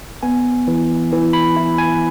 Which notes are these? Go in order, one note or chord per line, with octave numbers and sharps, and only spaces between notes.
B3 G#5
E3
E3
B5
E4
G#5